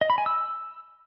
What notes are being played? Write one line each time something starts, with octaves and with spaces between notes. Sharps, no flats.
D#5
B5
G#5
E6